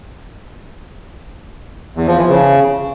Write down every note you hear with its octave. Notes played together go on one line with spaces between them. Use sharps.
E2
F3
E3
C#3